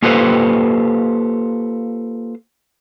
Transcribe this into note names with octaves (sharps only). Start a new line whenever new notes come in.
A#3 F4 G4 A4 B4 C5